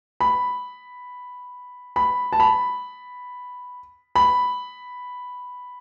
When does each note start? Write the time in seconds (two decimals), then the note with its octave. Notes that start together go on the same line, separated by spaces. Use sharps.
0.21 B5
1.96 B5
2.33 A5
2.40 B5
4.16 B5